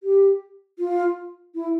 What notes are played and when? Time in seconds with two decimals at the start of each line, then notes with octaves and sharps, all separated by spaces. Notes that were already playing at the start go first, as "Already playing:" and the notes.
0.03 G4
0.79 F4
1.55 E4